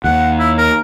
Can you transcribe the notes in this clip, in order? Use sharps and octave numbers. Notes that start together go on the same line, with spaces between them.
D#2 F#5
E4
A#4